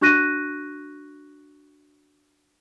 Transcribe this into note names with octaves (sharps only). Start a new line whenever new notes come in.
D4 F#4 C#6 F#6 A#6 D#7